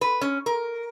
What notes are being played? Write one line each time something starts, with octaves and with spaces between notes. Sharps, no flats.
B4
C#4
A#4